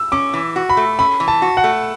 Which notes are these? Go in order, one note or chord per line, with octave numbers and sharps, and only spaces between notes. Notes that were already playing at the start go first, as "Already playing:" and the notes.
Already playing: E6
C#4 D6
E3
F#4
B5
A3
C#4 B5
E3
A5
F#4
F#5
A3